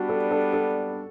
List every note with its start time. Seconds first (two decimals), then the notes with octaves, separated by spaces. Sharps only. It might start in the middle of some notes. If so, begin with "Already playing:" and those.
Already playing: G3 B3 D4 F#4
0.09 A4
0.31 A4
0.53 A4